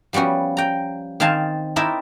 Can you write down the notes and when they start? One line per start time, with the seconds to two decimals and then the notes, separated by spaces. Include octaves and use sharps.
0.13 F3 G3 B3 C#4 F#4
0.57 G5 A#5
1.20 D#3 C4 F5 G#5 A5
1.76 C4 D#4 E4 A#4 D5 E5